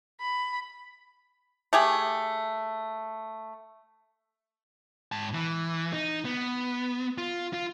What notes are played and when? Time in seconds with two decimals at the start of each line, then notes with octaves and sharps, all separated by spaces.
0.21 B5
1.73 A3 G4 G#4
5.12 G#2 A5
5.34 E3
5.93 D#4
6.25 B3
7.18 F4
7.53 F4